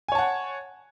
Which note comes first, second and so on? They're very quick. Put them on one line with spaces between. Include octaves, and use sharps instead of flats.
G#5 C#5 A5 F#5